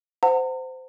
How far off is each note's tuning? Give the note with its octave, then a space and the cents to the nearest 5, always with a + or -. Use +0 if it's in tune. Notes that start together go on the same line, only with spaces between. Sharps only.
C5 -20 F#5 +0 A#5 -45